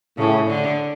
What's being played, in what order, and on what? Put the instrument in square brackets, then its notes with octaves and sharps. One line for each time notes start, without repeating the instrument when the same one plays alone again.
[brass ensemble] A2 [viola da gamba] C#3
[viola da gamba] D3